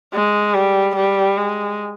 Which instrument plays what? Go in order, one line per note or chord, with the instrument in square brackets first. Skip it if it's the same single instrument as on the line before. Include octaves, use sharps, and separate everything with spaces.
[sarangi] G#3
G3
G3
G#3